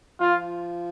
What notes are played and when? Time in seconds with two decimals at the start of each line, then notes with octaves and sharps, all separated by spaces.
0.20 F3 F4